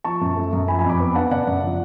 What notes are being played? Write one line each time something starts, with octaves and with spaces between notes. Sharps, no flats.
F3 A5 C#6
F#2
A3
F#2
F3 G#5 B5
G#5 B5
F2
B5 D6
B3
D4 F#5 A5
C#3 D5 F#5
F#2
F3